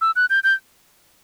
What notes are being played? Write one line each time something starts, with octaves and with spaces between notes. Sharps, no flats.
E6
F#6
G6
G6